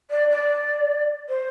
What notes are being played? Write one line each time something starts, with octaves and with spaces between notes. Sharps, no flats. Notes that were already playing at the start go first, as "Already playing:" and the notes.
D5
D5
C5